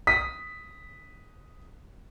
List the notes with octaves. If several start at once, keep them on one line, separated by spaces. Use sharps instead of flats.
D#6 B6